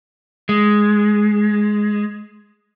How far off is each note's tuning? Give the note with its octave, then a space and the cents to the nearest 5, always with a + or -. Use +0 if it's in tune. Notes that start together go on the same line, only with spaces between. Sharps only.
G#3 +5